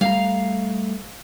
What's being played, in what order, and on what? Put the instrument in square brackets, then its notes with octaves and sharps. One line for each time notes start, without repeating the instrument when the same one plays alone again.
[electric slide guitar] G3 A3 A#5 [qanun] F5